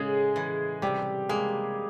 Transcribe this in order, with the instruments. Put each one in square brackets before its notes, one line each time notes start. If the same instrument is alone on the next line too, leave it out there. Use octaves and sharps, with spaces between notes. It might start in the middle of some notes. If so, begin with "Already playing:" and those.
Already playing: [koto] A2 C#3 [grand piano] G#3 G#4
[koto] E3
[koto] C3 [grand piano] G3 G4
[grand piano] G#3 G#4 [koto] A#3